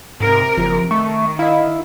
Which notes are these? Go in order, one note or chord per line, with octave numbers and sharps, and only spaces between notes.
G#2 C3 A#4
F#1 F3
D#3 A3 C#6
E4 D#5 F5